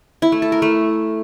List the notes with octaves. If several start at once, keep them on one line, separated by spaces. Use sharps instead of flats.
E4
A3
A4
A#4
A3